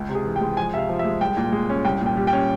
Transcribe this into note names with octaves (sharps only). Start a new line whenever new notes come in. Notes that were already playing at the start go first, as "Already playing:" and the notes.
Already playing: C#2
C3
G#4
E3
G5
G#3
F2 G#5
C3 E5 F5
F3
E5
G#3
C2 G5
A#2
G#3
C#4
C2 G5
A#2
G5
G3
G5
C#4